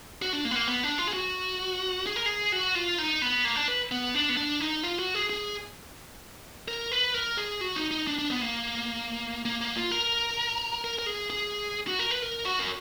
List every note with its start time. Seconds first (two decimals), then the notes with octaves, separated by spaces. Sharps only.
0.22 F#4
0.33 D4
0.45 A#3
0.51 B3
0.56 A#3
0.68 B3
0.83 D4
0.98 F4
1.08 G#4
1.13 F#4
2.06 G#4
2.16 A#4
2.26 G#4
2.52 F#4
2.75 F4
2.98 D#4
3.22 B3
3.45 A#3
3.56 D4
3.68 B4
3.91 B3
4.15 D4
4.29 B3
4.37 D4
4.60 D#4
4.83 F4
4.99 F#4
5.14 G#4
5.30 G#4
6.68 A#4
6.92 B4
7.14 A#4
7.37 G#4
7.61 F#4
7.76 D#4
7.91 D#4
8.07 D4
8.19 D4
8.30 B3
8.41 A#3
9.45 A#3
9.61 A#3
9.76 F4
9.91 A#4
10.84 A#4
10.99 A#4
11.06 G#4
11.30 G#4
11.87 F#4
11.99 A#4
12.11 B4
12.22 A#4
12.45 F#4
12.59 A#4